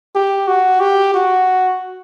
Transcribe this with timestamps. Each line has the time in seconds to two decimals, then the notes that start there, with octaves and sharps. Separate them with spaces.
0.15 G4
0.48 F#4
0.80 G4
1.14 F#4